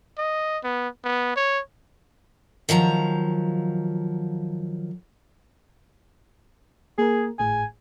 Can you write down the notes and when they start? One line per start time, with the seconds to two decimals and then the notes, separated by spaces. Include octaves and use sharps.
0.18 D#5
0.64 B3
1.04 B3
1.36 C#5
2.69 D#3 F3 F#3 A#5
6.98 A#3 G#4 A#4
7.39 G#1 A2 G#4 G#5